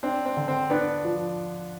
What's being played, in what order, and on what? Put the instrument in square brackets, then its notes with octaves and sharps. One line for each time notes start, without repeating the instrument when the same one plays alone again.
[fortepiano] C4 [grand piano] D4
[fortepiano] C4
[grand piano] D3
[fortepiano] C4
[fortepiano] B3 [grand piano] D4
[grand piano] F3